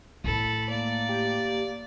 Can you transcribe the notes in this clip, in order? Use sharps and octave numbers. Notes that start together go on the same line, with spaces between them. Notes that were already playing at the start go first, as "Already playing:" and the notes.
A2 A3 A4 B5
A#3 D5
G4